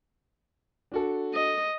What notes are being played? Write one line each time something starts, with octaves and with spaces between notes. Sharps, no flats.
D4 F#4 A4
D#5